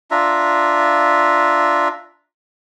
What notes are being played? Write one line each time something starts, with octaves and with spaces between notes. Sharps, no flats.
D4 F4 E5 A#5